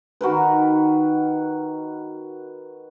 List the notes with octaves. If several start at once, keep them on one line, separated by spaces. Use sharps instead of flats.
D#3 F#4 A#4 B4